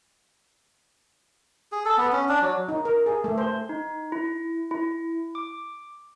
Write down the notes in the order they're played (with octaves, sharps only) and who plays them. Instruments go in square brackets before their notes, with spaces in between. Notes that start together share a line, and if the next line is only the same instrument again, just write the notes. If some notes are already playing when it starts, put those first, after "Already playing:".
[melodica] G#4
A4
B3
C#4
D4
F#3
[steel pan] D#4
A#4
G#4
A3
C5
[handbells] D#4
E4
E4
D6